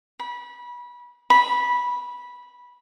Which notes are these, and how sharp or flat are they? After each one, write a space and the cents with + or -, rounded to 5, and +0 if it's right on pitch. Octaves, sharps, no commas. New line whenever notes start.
B5 -25
B5 -15